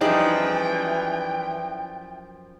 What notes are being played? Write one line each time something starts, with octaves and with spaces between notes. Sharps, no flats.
F#2 E3 F3 G3 D#4 G#4 D5 G5